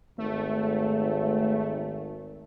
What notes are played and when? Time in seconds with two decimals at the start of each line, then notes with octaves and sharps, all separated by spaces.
0.18 G#1 A3